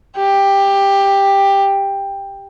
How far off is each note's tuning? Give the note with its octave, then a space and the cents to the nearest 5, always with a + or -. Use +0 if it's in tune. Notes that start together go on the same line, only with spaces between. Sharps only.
G4 +10